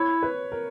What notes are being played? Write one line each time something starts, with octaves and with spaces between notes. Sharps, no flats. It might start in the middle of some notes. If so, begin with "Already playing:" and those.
Already playing: E4 C#5
B4
A#4